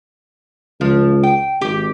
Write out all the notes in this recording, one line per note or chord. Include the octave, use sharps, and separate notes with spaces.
C#2 F3
G5
G#1 G4